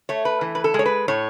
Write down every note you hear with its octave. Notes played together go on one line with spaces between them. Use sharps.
A3 C#5
B4
E3
B4
A4
G#3 C#5
B4
A2 C#5